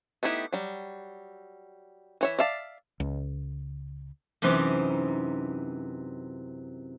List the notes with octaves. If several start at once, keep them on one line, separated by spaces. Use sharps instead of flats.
A3 B3 D#4 E4 G4
F#3 G3
E3 C#5 E5
D5 E5 F5 A5
C#2
F#2 C3 E3 C4 D#4